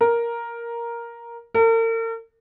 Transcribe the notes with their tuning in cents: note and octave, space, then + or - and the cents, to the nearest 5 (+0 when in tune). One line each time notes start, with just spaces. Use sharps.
A#4 +5
A#4 -45